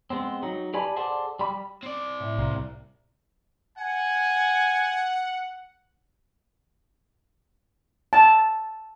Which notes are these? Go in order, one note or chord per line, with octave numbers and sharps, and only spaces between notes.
G#3 B3 C4
F#3 D#4
G4 B4 D5 G#5 A5 B5
G#4 A4 C5 D5 F#5 A5
G3 B5
C4 D5
A2 E5 D7
C2 A#3
F#5 G#5
A5